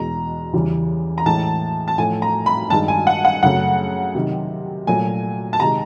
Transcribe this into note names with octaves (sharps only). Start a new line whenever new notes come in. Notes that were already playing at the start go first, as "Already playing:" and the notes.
Already playing: E2 B2 G#3 A#5
E2 C#3 E3 G3
A#5
A2 E3 G#3 A5
A5
A2 F3 A3 G#5
A#5
B5
G2 D#3 G#3 A5
G#5
F#5
F#5
F#2 C#3 F#3 A3 F#5
C3 D#3 F#3
A#2 F#3 A3 G#5
A5
C3 D#3 G#3 A#5